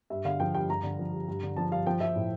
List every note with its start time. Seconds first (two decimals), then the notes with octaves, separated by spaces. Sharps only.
0.10 G2 E5
0.25 D3 F5
0.40 F3 G5
0.54 G2 G5
0.70 G2 A#5
0.83 D3
0.99 F3
1.13 G2
1.28 G2
1.43 D3
1.56 F3 A5
1.72 G2 F5
1.87 F3 G5
2.00 F3 E5
2.16 A2